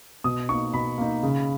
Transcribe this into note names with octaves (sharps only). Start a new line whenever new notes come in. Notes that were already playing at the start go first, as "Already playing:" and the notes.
B2 D#6
A#3 D#4 C#6
B2 B5
A#3 D#4
C#3